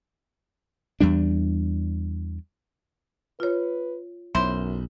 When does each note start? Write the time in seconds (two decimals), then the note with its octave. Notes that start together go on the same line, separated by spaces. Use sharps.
1.01 E2 G3 D4
3.40 F4 B4 C#5
4.35 B1 F#2 C#4 E4 C5